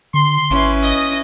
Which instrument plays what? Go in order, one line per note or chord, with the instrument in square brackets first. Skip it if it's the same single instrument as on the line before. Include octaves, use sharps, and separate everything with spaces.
[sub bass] D3 [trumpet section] C6
[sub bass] G#1 [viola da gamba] C#4 E4 B4
[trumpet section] D#5